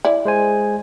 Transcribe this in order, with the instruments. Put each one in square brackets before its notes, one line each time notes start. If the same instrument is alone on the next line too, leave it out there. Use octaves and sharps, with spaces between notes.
[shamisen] E4 D5
[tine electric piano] G#3 C5 G#5